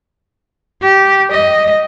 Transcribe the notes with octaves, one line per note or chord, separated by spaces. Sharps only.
G4
D#5